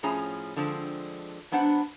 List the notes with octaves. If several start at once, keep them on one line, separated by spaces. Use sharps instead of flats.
A2 F3 C#4 G#4 A#5
D3 F3 G#3 C4
F#3 B3 D4 C5 F#5